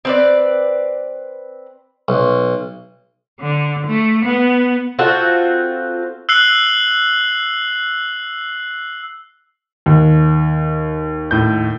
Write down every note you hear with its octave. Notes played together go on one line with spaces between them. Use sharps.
C4 B4 D5
B1
D3
A3
B3
C4 F4 F#4 A4
E6 F#6 C7 F#7
D#2
A2 G6